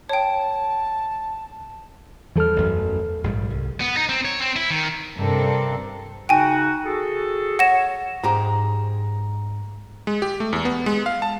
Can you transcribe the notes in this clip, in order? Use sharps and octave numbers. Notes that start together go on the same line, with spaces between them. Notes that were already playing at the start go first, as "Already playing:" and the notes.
C#5 G5 A5
E2 E3 F3 G3 A4 F6
A1 F#2
A#1 G#2 G3
C2
B3
D#4
C4
C#5
C4
E4
D#3
G2 C3 C4 D4 A4 A#4
C#3 D#4 F#4 G5 G#5
F#4 G#4 A4
C#5 F#5 A#6 E7
G#2 G#3 G4 A#5
G#3
G4
A3
E2
B3
G#3
F5
A5